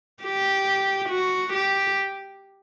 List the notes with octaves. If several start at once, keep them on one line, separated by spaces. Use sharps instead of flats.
G4
F#4
G4